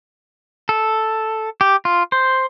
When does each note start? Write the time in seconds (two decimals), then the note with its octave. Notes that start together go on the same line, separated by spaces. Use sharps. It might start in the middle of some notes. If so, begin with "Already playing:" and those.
0.69 A4
1.61 G4
1.85 F4
2.12 C5